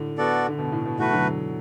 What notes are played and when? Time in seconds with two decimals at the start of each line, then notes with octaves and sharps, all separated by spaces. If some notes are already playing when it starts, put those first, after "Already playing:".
Already playing: A2 D3
0.18 B3 F#4 A4 D5
0.49 D3
0.59 B2
0.72 A2
0.86 B2
0.99 B2 E3 A3 F#4 B4
1.12 D3 F#3